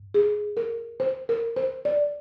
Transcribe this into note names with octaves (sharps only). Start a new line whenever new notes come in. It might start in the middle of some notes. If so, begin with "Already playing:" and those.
Already playing: G2
G#4
A#4
C5
A#4
C5
D5